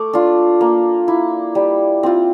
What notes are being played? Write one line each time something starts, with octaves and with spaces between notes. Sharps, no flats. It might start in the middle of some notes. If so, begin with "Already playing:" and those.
Already playing: A3 D6
D4 F4
A#3
E4
G3
C4 F4